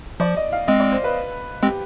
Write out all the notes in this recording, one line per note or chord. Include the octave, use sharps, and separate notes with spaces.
F3 D5
D#5
F5
G#3 C4 D#5
D5
C5
B4
G#3 C4 G4